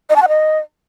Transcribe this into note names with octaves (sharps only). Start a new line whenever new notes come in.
D#5
A5
F#5
D#5